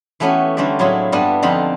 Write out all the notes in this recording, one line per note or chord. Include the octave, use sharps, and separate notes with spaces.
E3 A3 B3 C#4 F#4 G4
D3 G3 C#4 C5 D5 E5
A2 F#3 C4 E4 F4 G#4
G2 G3 B3 D4 A4
F2 D3 C4 D#4 F4 B5